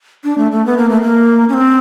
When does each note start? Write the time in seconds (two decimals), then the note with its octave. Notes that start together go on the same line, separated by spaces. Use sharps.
0.24 D4
0.38 A3
0.51 A3
0.66 B3
0.77 A#3
0.89 A3
1.02 A#3
1.49 C#4
1.53 C4